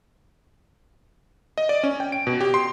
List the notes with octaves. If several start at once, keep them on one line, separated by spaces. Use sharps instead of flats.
D#5
D5
C#4
G5
D7
B2
G4
C6